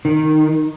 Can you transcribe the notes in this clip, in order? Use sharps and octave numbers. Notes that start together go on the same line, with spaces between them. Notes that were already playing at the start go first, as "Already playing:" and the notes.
D#3